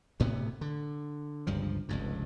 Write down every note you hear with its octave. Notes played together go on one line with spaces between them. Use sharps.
D2 A2 C3 B3
D3
G1 C#2 G2 F3
F1 C#2 G2